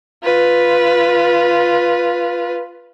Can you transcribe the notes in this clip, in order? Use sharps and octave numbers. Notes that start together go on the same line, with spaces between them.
F4 B4